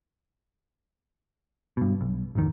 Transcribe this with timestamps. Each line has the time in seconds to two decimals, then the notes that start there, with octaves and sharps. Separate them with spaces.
1.77 G2 B2
2.01 B1
2.35 D1 G#1 F2 D#3